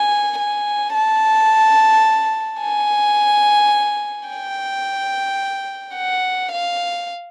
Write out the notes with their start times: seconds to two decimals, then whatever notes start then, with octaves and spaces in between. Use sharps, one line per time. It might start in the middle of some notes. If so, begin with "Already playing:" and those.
Already playing: G#5
0.39 G#5
0.94 A5
2.61 G#5
4.29 G5
5.95 F#5
6.51 F5